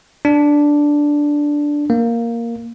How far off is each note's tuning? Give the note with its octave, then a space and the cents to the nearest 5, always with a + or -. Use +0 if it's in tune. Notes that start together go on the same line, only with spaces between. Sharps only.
D4 -5
A#3 +0